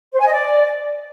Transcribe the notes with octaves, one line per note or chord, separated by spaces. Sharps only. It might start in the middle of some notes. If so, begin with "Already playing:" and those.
C5
G#5
D#5
D5